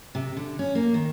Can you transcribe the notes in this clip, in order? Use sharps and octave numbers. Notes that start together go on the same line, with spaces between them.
C3
D3
C#4
A#3
D#3